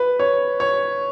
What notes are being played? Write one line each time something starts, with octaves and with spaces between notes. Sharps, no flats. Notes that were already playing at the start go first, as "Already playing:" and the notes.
Already playing: B4
C#5
C#5